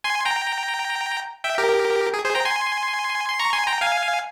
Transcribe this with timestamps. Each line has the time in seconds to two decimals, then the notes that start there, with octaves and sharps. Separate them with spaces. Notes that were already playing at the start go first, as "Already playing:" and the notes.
0.04 G#5 C6
0.25 G5 A#5
1.44 E5 G5
1.58 G4 A#4
2.14 G#4
2.24 G#4 C5
2.35 G5 A#5
2.45 G#5 C6
3.29 C6
3.39 A#5 C#6
3.53 G#5 C6
3.67 G5 A#5
3.81 F5 G#5